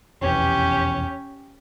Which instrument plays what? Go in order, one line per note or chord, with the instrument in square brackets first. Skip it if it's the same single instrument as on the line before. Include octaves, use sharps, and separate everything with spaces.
[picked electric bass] F1 B1 E2 [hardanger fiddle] C#4 G4